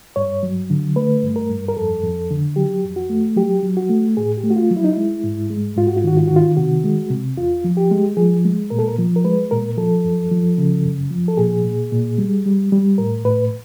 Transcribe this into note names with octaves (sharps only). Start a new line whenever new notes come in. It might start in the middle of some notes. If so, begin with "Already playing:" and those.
G2 C#5
F#3
D3
A3 B4
G2
A#4
G2
A#4
F2 A4
F2
D3
F#3 G4
F2
F#4
A3
F#3 G4
F#3
F#4
A3
A2 G#4
G4
A3
F#4
F4
F#3
E4
D#4
G#3 E4
G#2
G#3
G#2 F4
F#4
F4
D#3 F#4
F4
D#3 F#4
F4
C3 F#4
G#3
C3
E2 F4
F3
G4
G#3
F3 G#4
G#3
A#2 A#4
A4
A#4
F3
A#4
G#3 B4
A#2 A#4
F3 A4
F#2
F3
C#3
F#2
F3
A4
A#2 G#4
A#2
A#2
G3
G3
G3
A2 A#4
A2 B4